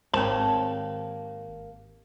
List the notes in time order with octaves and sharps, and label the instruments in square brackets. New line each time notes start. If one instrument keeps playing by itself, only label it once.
[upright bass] G#1 D#3 [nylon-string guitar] A#3 G4 C#5 [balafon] C4 C5 [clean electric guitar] A5